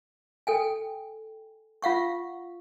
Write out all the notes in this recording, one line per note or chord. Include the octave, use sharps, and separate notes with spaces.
A4 G5 G#5
F4 F5 F#5 C#6